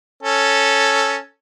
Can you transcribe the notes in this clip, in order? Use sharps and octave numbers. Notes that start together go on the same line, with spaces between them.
C#4 A4